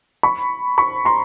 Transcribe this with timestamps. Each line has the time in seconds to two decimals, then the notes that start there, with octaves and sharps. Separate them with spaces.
0.23 B5 C#6
0.78 B5 C#6
1.05 A#5 C6